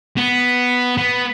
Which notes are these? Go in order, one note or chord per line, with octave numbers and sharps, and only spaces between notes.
B3
B3